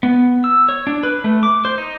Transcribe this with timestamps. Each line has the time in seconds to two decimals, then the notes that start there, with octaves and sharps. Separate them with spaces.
0.03 B3
0.44 E6
0.69 C#5
0.87 D4
1.03 B4
1.24 A3
1.43 D6
1.65 C5
1.78 D#4